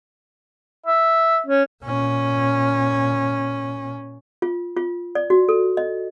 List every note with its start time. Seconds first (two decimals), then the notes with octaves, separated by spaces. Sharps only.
0.86 E5
1.46 C#4
1.84 A#2 C#4
4.42 F4
4.77 F4
5.15 D5
5.30 F#4
5.49 A4
5.77 D#5